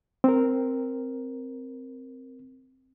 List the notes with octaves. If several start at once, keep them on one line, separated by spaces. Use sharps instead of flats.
C4 A#4